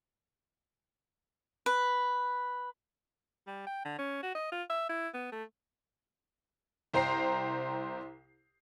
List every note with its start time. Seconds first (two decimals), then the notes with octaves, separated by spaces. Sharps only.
1.66 B4
3.47 G3
3.67 G5
3.85 D3
3.99 C#4
4.23 F#4
4.35 D#5
4.52 F4
4.70 E5
4.89 E4
5.14 B3
5.32 A3
6.93 C2 C5 G5 A#5 C7